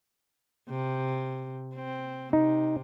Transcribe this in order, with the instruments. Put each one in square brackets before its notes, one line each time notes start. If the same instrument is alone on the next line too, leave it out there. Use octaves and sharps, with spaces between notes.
[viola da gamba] C3
C4
[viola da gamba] C3 [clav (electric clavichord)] D#4